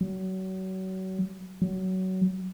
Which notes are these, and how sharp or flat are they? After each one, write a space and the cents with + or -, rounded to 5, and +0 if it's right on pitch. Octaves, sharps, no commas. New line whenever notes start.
F#3 +30
F#3 +20